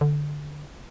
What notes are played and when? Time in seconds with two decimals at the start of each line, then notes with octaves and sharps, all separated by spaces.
0.01 D3